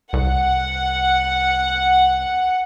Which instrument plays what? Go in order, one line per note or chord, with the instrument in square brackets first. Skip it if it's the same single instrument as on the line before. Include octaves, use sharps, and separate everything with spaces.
[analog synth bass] C2 [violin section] F#5